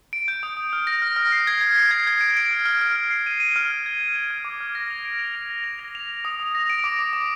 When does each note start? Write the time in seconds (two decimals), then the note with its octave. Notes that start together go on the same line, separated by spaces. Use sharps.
0.13 D7
0.28 G6
0.43 D#6
0.57 D#6
0.73 F6
0.87 A#6
1.02 F6
1.16 F6
1.32 C7
1.47 G#6
1.61 G#6
1.76 C7
1.91 G#6
2.07 G#6
2.21 D7
2.37 D7
2.51 F6
2.66 F6
2.81 F6
2.96 F6
3.10 C7
3.26 D#7
3.40 D#7
3.56 F6
3.71 G#6
3.86 G#6
4.00 G#6
4.16 D#7
4.31 F6
4.45 D6
4.60 F6
4.75 A#6
4.90 F7
5.05 D7
5.19 F7
5.35 G#6
5.50 A#6
5.64 F7
5.79 A#6
5.95 F7
6.09 F7
6.25 D#6
6.40 D#6
6.55 A#6
6.70 D7
6.84 D6
6.99 D6
7.13 D6